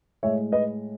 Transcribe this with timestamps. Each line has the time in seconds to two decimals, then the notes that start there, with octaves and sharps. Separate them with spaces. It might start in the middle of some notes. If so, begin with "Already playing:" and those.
0.23 A2 G#3 C#5 E5
0.52 B4 D#5